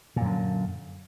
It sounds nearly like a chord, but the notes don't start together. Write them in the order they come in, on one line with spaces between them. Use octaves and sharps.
A#2 F#2 D3